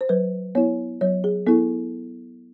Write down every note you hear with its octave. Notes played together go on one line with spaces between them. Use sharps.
C5
F#3 B4
B3 E4 C#5
F#3 C#5
G#4
B3 E4 A4